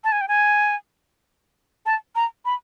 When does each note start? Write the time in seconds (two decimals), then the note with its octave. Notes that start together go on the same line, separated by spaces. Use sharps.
0.04 A5
0.12 G#5
0.21 G5
0.28 G#5
1.86 A5
2.15 A#5
2.45 B5